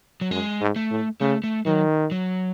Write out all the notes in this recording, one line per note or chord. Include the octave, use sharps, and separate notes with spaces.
F#3
F#2 G#3
G#2
A3
A2
C#3 A3
A3
D#3 F#3
F#3